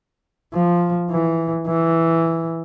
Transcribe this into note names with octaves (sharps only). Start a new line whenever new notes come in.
F3
E3
E3